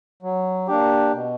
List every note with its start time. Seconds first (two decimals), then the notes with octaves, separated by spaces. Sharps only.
0.22 F#3
0.68 A#3 D4 G4
1.13 B2